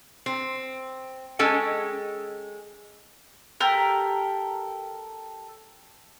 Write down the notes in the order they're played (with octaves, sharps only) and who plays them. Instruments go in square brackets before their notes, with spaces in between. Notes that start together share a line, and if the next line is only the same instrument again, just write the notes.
[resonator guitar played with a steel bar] C4
G#3 C#4 A4 G5 G#5
[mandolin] G4 A4 A#4